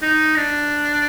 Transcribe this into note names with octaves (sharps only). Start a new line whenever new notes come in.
D#4
D4